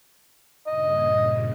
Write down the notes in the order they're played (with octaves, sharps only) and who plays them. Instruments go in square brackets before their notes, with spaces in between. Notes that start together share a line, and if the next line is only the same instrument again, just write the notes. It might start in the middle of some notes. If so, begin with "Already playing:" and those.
[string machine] G2 A#2 C#3 [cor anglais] D#5